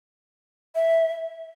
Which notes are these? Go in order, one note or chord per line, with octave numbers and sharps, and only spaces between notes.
E5